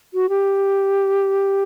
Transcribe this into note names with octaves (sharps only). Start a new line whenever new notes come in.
F#4
G4